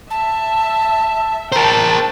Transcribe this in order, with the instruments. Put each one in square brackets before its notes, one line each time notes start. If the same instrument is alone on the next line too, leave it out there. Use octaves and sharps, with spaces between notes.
[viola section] E5 [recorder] A5
[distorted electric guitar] A#4 C5 [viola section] G5 A5 [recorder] A#5